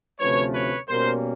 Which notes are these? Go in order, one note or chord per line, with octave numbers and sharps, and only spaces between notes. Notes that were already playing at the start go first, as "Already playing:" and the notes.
D2 C3 F3 A3 C#4 B4 C#5
B4 C#5
B2 G3 A#3 C#4 A#4 C5